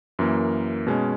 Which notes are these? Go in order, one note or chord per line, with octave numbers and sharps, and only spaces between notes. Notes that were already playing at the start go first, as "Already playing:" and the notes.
F#2 E3 A#3
B2 G#3 C#4